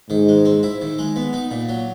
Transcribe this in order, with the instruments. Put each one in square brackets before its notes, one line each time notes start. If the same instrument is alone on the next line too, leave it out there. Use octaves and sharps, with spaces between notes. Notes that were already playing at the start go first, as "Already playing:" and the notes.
[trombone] G#2 [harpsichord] D#3
[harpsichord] G#3
C4
E4
D#3
G#3
B3
D#4
A#2
F#3